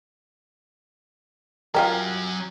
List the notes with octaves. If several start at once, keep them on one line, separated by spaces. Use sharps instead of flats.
F#3 F4 G4 A#4 G#5